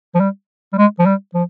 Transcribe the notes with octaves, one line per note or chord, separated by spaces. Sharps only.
F3
G3
G3
G#3
F3
G3
F3